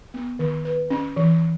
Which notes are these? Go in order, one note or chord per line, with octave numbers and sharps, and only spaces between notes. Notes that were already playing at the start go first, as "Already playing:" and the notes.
B3
D#3
B4
C#4
E3